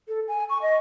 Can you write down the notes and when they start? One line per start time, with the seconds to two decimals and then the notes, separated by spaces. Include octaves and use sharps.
0.08 A4
0.28 G#5
0.50 C#6
0.62 D#5